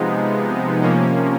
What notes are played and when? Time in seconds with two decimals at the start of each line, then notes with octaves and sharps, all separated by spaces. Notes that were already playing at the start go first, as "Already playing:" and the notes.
Already playing: C3 F3 G#3 B3 D#4
0.82 C3 F3 A#3 C#4